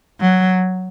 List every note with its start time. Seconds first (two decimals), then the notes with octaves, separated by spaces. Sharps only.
0.20 F#3